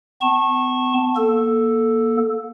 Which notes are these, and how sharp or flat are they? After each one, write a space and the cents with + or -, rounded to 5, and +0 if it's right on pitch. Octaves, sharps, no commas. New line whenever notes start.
B3 +45 A5 +0 C#6 -25
A#3 +25 A4 +0